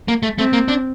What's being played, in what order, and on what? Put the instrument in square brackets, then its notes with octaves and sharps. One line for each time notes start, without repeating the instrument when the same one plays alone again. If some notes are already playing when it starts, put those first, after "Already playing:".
[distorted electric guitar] A#3
A3
[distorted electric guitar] A3 [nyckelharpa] C4
[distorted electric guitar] A#3
D4